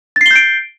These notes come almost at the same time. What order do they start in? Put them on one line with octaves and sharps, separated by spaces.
A6 C7 G7 G6 D7